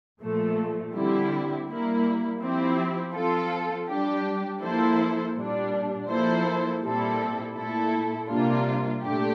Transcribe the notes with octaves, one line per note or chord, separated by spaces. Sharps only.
A#2 F3 A3
D3 G3 C4 E4 G4
G3 A#3 E4
F3 C4 E4 G4
F3 C4 F4 A4
G3 D4 G4
F3 A#3 E4 A4 C5
A#2 G3 D4
F3 A#3 E4 A4 C5
A#2 G3 C4 E4 A4
A#2 A3 E4 A4
C3 G3 A#3 D4 F4
A#2 A3 D4 G4